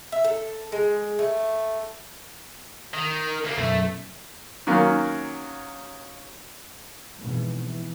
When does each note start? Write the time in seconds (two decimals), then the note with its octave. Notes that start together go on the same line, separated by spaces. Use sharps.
0.12 E5
0.25 A4
0.72 G#3
1.19 A3
2.94 D#3
3.44 D2 A#3
3.58 B1 F#2 A3
4.67 D#3 F#3 A#3 C#4
7.18 F2 G#2 B2 E3
7.60 E3